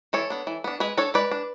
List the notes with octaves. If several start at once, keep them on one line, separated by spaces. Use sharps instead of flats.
E3 A4 C#5
B3 D4
E3
B3 D4
G#3 G#4 B4
D4 A4 C#5
G#3 B4 D5
D4